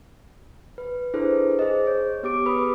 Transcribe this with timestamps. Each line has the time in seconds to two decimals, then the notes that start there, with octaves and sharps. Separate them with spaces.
0.78 B4
1.14 D4 E4 G#4 A4 B4 C5
1.59 G#4 C5 D#5
1.87 C#5
2.23 B3 G4 D6 D7
2.45 G#4 B4 B5 D#6